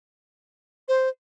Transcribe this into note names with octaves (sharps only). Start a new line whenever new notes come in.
C5